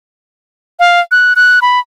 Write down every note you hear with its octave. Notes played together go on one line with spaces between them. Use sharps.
F5
F#6
F#6
B5